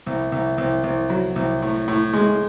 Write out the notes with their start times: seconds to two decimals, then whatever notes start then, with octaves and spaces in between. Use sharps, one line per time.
0.07 C2
0.32 C2
0.58 C2
0.84 C2
1.10 F#3
1.36 C2
1.62 A2
1.88 A2
2.13 G#3